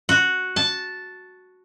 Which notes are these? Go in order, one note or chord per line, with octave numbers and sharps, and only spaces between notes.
F#4
A5